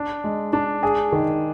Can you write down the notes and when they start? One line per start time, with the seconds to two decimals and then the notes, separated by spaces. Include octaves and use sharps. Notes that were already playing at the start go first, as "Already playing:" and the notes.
Already playing: D4
0.24 G#3
0.53 D4
0.83 G#4
1.12 D#3